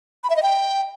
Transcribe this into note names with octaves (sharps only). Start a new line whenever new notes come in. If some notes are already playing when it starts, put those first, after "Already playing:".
B5
E5
D#5
G5